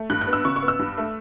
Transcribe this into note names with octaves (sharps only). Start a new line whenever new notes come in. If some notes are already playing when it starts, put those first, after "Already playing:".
Already playing: A3
G2 F#6
F#6
B3
E6
C#3 C#6
C#6
B3
E6
G2
A3